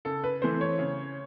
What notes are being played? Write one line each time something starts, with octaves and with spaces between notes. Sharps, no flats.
C#3 A4
B4
E3 A3 C4 C5
C#5
C#3